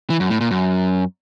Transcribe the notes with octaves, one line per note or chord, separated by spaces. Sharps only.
E3
F#2
A2
A#2
F#2